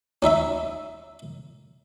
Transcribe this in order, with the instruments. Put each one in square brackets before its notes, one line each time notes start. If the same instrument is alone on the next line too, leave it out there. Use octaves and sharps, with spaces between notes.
[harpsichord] C#4 D#4 E5 B5